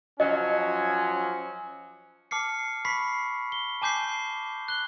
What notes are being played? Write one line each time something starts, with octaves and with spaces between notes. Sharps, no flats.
F3 F#3 C#4 D#5
A5 D6 F6 C7 C#7
B5 C#6 B6 C7
G7
G#5 A5 D6 G6 B6 C7
F#6 G7